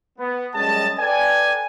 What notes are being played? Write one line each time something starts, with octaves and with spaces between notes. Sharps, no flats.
B3
F#2 G3 G#3 C#4 D#5 A5
A4 B4 D5 G5 G#5